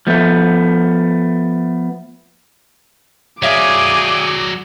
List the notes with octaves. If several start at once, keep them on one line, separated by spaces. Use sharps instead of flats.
F3 A3 B3
F#3 G#4 C#5 D5 E5 F5 G#5 D6